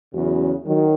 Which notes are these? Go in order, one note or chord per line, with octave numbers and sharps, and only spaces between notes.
E2 C#3 F#3 C#4 F#4
D#3 F#3